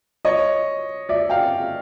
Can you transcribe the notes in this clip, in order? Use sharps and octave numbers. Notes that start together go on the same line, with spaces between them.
C#5 D#5
D5 E5
F5 G5